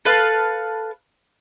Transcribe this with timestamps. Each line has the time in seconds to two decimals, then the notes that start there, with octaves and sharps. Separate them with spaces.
0.05 A4 B4 F5